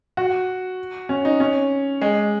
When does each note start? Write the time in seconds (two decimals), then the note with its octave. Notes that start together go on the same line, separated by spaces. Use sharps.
0.17 F#4
1.09 C#4
1.25 D#4
1.40 C#4
2.01 G#3